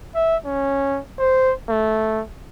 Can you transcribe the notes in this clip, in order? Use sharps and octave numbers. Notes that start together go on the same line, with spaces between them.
E5
C#4
C5
A3